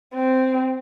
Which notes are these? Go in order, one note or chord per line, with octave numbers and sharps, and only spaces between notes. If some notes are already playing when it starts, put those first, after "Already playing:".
C4